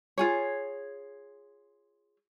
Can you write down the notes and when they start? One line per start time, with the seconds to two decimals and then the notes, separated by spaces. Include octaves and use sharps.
0.18 F4 G#4 C#5